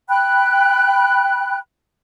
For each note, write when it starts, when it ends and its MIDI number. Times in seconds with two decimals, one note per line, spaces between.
0.08 1.58 79
0.08 1.58 83
0.08 1.58 90